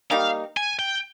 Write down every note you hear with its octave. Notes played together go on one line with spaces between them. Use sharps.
G3 A#3 D#4 F5
G#5
G5